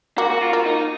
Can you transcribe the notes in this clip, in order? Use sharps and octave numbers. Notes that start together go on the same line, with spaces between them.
A#3 F#4
F#4
F4
A#3
D#4